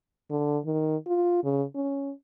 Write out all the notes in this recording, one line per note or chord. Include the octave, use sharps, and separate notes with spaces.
D3
D#3
F4
C#3
C#4